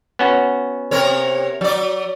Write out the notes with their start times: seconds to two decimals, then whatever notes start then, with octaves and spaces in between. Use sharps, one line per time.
0.19 B3 C#4 F#4
0.91 C3 A#4 C#5
1.61 F#3 D5